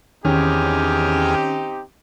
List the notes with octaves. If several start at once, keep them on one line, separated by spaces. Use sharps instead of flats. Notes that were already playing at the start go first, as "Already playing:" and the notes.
E2 D#3 C4 C#4 D#4 G4 G#4 F6